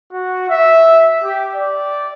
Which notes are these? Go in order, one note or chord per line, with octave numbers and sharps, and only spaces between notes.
F#4
E5
G4
D5